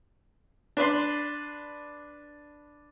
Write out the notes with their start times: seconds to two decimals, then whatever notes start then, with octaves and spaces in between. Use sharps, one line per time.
0.77 D4 B4 D5 C6